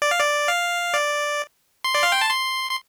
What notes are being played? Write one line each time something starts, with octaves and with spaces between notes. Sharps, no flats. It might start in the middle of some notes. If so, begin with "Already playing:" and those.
D5
F5
D5
F5
D5
C6
D5
F5
G5
A5
C6
C6